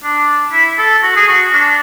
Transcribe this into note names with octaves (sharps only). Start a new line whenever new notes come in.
D4
E4
A4
F#4
G#4
F#4
D4